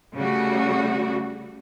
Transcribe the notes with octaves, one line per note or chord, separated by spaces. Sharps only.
C#3 G3 A3 F#4